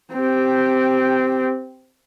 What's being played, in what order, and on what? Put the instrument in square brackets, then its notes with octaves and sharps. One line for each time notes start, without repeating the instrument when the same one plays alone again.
[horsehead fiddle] C4 G4